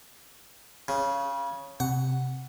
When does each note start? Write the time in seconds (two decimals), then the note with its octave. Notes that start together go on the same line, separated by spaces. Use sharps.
0.88 C#3
1.80 C3 F#5